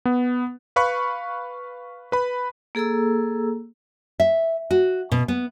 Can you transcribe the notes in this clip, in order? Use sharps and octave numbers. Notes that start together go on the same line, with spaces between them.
B3
B4 F5 B5 C#6 F#6
B4 B5
A#3 G#4 A4 A#5 E6
E5
F#4
B2
B3